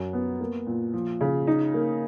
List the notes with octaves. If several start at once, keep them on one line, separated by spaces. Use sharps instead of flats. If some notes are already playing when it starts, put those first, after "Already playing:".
Already playing: F#2
B3
A#3
A#2
F3
C#3
D#4
A#3